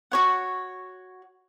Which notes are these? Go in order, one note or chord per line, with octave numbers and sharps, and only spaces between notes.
F#4 C#5 F#5